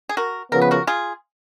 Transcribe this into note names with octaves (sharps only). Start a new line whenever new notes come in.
G#4
F#4 A#4
C#3 F3 B3 A#4
B4
F#4 A#4
F4 G#4